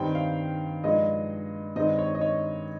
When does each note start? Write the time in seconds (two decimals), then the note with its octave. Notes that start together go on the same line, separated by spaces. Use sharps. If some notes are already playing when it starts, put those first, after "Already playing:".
Already playing: G2 D#3 G3 C4 D#4 G5
0.15 F5
0.84 G2 F3 G#3 D#4 D#5
1.76 G2 D#3 G#3 C4 D#4 D#5
1.99 C#5
2.15 D#5
2.21 C#5